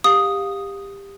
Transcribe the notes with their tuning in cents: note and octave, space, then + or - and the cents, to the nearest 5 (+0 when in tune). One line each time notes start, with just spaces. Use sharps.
G4 +20 F5 +20 D#6 +0